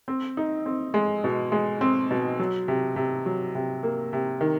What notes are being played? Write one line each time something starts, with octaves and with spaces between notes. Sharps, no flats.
C4
D#4
C4
G#3
B2
G#3
C4
B2
F#3
C3
C3
F#3
C3
A#3
C3
D#3